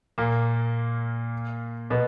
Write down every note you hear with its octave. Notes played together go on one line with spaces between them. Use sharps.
A#2 A#3
B2 B3